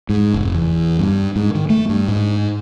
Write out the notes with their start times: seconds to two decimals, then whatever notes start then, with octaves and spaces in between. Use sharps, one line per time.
0.09 G#2
0.34 F1
0.55 E2
0.99 G2
1.36 G#2
1.55 D#3
1.70 A3
1.89 G2
2.08 G#2